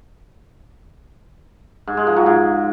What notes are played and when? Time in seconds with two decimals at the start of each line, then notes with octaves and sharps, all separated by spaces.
1.87 G#2
1.97 G#3
2.07 F3
2.16 F#3
2.26 G#2